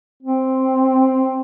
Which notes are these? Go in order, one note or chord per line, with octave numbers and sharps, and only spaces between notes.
C4